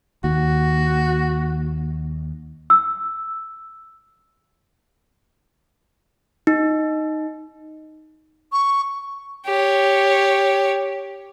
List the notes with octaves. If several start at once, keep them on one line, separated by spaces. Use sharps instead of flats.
D#2 F#4
E6
D#4
C#6
G4 C#5